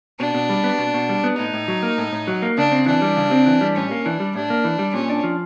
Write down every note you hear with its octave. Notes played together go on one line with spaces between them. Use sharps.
B2 D4
B2
G3
B3
B2
B2
G3
B3
A2 D#4
A2
F#3
A#3
A2
A2
F#3
A#3
C#3 D4
C4
E3 D4
G3
C#3
C4
E3
G3
A2 C#4
A#3
E3 D4
G3
A2 D4
A#3
E3
G3
A#2 C#4
D4
F3